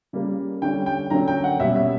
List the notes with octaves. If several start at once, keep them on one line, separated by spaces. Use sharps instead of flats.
C#3 G3 A#3
D3 G3 C#4 G5
G5
D3 F#3 A#3 C#4 A#5
G5
F#5
B2 G3 A#3 C#4 E5
E5